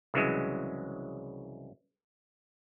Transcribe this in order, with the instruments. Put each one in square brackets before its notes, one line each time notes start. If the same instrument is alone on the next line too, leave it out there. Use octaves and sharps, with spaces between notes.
[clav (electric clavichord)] C2 C#3 E3 F#3 G#3